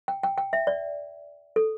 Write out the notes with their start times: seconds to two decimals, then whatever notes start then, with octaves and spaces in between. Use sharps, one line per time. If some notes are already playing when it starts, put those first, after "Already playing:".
0.08 G5
0.23 G5
0.38 G5
0.53 E5
0.67 D5
1.56 A4